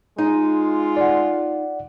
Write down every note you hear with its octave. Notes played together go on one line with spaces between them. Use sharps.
G#3 D#4 F4
D5 F#5